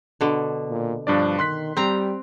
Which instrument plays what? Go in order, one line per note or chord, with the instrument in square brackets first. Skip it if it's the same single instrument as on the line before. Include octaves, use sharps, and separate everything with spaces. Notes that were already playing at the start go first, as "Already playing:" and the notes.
[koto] B2 D3
[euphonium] A#2
[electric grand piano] G2 D4 D5 [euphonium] F3
[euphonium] D#3 [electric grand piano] C6 F#6 B6
[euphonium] G3 [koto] C4 A#5